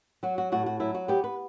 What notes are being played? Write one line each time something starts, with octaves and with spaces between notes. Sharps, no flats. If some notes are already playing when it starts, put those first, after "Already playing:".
F#3 F#4
F#4
A2 F#4
F#4
F#3 E4
F#4
B3 G4
B4